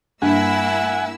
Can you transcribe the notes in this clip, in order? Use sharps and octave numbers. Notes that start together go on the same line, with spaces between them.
G2 A#3 E4 F#5 G#5 E6